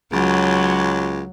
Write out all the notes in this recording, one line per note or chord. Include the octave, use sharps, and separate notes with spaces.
C#2 F#3